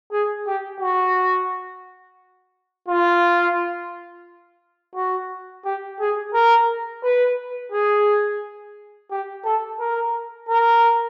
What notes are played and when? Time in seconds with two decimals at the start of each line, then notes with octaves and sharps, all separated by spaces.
0.12 G#4
0.46 G4
0.80 F#4
2.88 F4
4.95 F#4
5.65 G4
6.00 G#4
6.34 A#4
7.03 B4
7.72 G#4
9.11 G4
9.45 A4
9.80 A#4
10.49 A#4